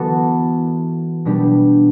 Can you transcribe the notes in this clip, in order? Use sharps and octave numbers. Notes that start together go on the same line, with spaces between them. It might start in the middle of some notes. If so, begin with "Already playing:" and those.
Already playing: E3 B3 F#4 A4
B2 G3 D4 G4